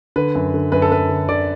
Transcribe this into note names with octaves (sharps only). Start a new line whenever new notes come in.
D3 B4
F#2
D3
F#2 B4
A4
F#2 B4
D3
D3 D5